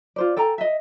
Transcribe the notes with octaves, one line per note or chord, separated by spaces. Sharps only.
F4 C5 D5
A4 G5 G#5 A#5
D#5 E5